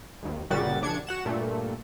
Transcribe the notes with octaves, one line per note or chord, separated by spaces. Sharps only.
G#1 D#2
G1 A#2 C#3 G3 F#4 A6
A#1 C#3 D4 G#6 C#7
F#4 F#5 E7
G2 A#2 A3